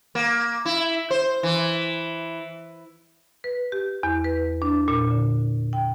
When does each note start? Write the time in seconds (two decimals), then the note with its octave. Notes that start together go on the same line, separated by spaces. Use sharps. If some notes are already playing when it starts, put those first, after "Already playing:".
0.15 A#3
0.65 E4
1.11 C5
1.43 E3
3.44 B4
3.72 G4
4.03 E2
4.24 B4
4.62 D4
4.88 A#2
5.11 D3
5.73 G5